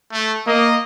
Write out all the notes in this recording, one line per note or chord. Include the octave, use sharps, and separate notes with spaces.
A3
A#3 D#5